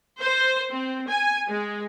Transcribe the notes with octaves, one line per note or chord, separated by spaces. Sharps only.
C5
C4
G#5
G#3